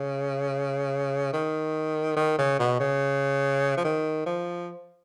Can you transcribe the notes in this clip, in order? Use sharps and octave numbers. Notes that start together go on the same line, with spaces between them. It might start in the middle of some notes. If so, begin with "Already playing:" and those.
Already playing: C#3
D#3
D#3
C#3
B2
C#3
F3
D#3
F3